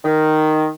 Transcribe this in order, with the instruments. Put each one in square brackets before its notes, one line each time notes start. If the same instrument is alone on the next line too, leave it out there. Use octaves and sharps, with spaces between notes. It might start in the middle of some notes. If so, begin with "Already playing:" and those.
[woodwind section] D#3